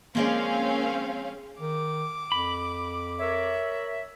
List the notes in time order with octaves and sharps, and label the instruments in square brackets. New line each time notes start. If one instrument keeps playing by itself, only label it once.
[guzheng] F3 G#3 D5 [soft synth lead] A#3 [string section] C4 C#4 F5
[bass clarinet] D#3 [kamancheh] D6
[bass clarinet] F2 [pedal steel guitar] B5
[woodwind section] A#4 C#5 E5